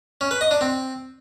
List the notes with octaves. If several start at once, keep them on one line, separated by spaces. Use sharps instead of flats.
C#4
B4
D#5
D4
C4